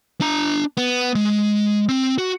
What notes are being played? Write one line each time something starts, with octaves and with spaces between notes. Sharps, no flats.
D4 A#5
B3
G#3
C4
F#4